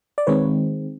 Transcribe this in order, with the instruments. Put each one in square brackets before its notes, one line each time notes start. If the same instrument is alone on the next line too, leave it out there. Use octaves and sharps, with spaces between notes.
[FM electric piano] D5
D#3 G#3 C4 B4 C#5